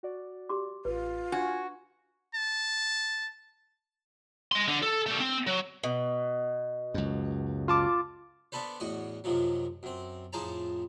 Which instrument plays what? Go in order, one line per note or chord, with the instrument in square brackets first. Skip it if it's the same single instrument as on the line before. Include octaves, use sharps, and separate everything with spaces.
[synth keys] F#4 D5
[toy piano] G4 C6 D6
[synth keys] A1 [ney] F4 [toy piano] B4
[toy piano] D4 [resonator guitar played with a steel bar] F#4 [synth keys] G#5 G#6
[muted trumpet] A5
[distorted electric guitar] D#5 C6
D3
A4
G3 A3
C4
F#3
[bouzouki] B2
[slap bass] C#2 F#2
[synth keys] F4 A5 D6
[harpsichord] B3 D4 A4 B4 C5
E2 A2 F#4 D#5
F#2 C3 D#3 F3 F#3
F#2 C4
F2 A2 G#4 C5 A5 A#5